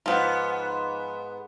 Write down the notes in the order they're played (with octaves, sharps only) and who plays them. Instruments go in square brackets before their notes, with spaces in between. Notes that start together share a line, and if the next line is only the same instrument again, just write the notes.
[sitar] G#2 B3 [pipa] F3 F4